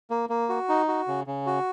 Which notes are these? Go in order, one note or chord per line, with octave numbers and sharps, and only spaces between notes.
A#3
A#3
F#4
D#4
F#4
C#3
C#3
F#4